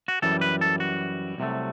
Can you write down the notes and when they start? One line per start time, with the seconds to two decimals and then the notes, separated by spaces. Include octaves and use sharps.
0.08 F#4
0.22 F#2 E3 G3 A4
0.41 B4
0.61 A4
0.80 F#4
1.38 C2 C3 F#3 A3